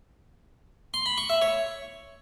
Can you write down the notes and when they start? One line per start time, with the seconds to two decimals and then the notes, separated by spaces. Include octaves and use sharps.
0.94 C6
1.06 B5
1.18 C#6
1.30 E5
1.42 C#5